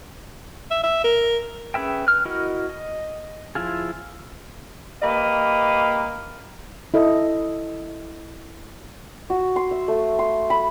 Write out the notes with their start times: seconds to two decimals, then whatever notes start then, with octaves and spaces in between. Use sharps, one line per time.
0.71 E5
0.83 E5
1.04 A#4
1.74 C#4 G#4 B4 E5 G5
2.07 B4 F6
2.25 E4 F#4 A#4 D#5
2.69 D#5
3.55 F3 E4 F4 G#4
5.02 A#3 G4 B4 D#5 F5
6.94 E4 A4 D#5
9.30 F#4
9.56 C6
9.71 E5
9.88 A3
10.19 C6
10.50 B5